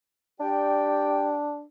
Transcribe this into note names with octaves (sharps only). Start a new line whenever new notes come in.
D4 G4 D5 G5